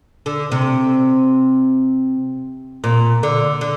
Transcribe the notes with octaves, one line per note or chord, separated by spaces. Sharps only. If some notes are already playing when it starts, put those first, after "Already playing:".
D3
C3
A#2
D3
D3